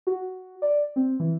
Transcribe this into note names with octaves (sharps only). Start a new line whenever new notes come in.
F#4
D5
C4
E3